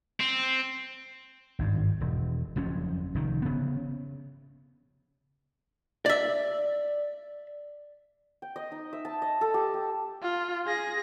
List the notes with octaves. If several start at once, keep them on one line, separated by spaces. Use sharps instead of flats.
C4
G#1 G2
E1
F#1 F2 F3 C#4
F1 D#3
C#3 B3
D5 E5
G5
D#5
D#4
E5
A5
D#5
A4
G4
G4
F4
G#4 A#6